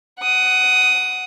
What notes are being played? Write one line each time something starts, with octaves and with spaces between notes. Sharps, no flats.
F#5 D#6